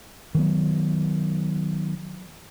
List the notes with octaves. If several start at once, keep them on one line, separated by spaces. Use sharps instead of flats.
D#3 F#3 B3